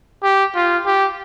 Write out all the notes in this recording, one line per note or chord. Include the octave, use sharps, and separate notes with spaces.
G4
F4
G4